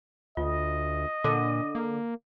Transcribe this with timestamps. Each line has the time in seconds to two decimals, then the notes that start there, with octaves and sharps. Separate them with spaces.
0.37 D2 F4 D#5
1.24 A#2 D3 D6 D#7
1.75 A#3